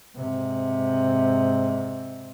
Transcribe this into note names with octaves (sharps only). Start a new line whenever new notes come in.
G#2 C3